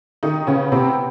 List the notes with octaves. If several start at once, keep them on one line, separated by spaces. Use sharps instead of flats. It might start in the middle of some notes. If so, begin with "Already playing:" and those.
D#3 D#4 G4
C#3 B3 C#4
C3 C4 G4